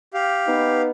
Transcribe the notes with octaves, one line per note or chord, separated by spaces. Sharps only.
G4 F5
B3 D#4 B4